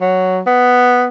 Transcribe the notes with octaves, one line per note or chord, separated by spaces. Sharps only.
F#3
B3